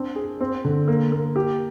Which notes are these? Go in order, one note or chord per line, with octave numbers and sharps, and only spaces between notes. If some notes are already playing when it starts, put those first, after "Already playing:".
Already playing: C4 D4
G#4
C4
D3
A#3
A#3
G4